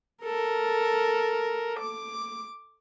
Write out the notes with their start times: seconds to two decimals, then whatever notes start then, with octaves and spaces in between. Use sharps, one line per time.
0.23 A4 A#4
1.79 D6